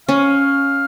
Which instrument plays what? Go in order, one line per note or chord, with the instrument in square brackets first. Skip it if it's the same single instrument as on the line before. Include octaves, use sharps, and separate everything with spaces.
[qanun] C#4 [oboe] F5